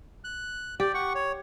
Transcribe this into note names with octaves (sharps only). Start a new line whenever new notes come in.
F#6
G4 D5
F#5 C#6
C#5